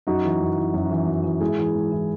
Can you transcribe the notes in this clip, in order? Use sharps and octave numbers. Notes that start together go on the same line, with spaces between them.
F#2 D#4 F#4
E3
F#2
E3
F#2
E3
F#2
E3
G#2 E4 G#4
E3
G#2
E3